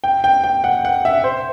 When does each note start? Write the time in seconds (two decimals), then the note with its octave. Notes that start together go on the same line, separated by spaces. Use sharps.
0.04 G5
0.24 G5
0.44 G5
0.64 F#5
0.85 F#5
1.05 E5
1.24 C5